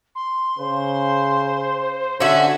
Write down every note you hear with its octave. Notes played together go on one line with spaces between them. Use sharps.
C6
C#3 C5
D3 C#4 F#4 E5